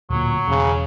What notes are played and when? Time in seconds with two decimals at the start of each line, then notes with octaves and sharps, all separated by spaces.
0.10 D1 A#2 F#3
0.48 E1 C#3